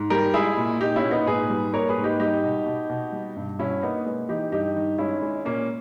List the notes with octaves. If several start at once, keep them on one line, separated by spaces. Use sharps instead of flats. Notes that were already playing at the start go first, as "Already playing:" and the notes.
Already playing: G#2
G3 G4 A#4
G#3 E4 G#4
A#2
A#2 D#4 G4
C#4 E4
A#2
B3 D#4
G#2 G#4 B4
G3
A#3 A#4 C#5
G#4 B4
G#2
D#4 G4
G3 D#4 G4
B2
B2
B2
G3
G2
B2 C#4 E4
A#3 B3 D#4
G#3
E3 D#4 G4
G2 D#4 G4
D#3
G#3 C#4 E4
G#3
A#2 A#3 C#4